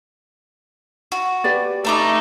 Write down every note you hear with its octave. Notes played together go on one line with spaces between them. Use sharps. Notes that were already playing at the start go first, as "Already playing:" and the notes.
F#4
G4 B4 D5
A3 D4 D#4 A#5 D6